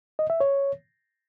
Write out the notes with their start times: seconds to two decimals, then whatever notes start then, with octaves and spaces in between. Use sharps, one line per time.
0.19 D#5
0.30 E5
0.40 C#5